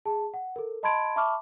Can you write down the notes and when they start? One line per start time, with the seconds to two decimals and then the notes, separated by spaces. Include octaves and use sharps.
0.05 G#4 A5
0.34 F#5
0.56 A4 A#4
0.83 D#5 A5 B5 C6 G#6 D7
1.16 E5 A5 B5 C#6 D6 F6